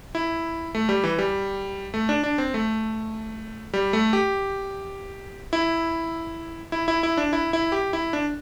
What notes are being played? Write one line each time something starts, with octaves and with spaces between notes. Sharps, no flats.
E4
A3
G3
E3
G3
A3
D4
D4
C4
A3
G3
A3
G4
E4
E4
E4
E4
D4
E4
E4
G4
E4
D4